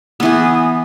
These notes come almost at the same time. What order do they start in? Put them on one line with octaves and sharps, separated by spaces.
B3 E3 G#4